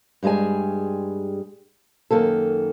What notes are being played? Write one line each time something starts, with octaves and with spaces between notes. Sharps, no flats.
G2 G3 G#3 G#4 G#5
F#2 D#3 A#3 A4